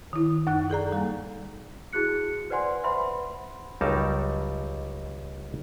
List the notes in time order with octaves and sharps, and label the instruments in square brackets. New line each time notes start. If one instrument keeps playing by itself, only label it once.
[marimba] D#3 E4
F#2 D#4 F#6
G#4 A4 D5 A#5
G3 A#3
[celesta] E4 F#4 G#4 F#6 C#7
B4 C5 D5 F#5 G#5 C6
B4 C5 E5 F#5 B5 C6
[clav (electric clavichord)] C#2 F#3 G3 D#4 A#4 A5